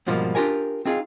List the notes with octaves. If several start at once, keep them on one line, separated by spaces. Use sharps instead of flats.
G#2 B2 F3 G3 A#3
D4 F4 G4 A#4 G#5
C4 D#4 F4 G#4